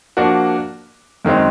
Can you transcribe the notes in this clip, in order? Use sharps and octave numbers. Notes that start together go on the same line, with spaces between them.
F3 A#3 D4 F#4
F#2 D#3 G#3 C4 D#4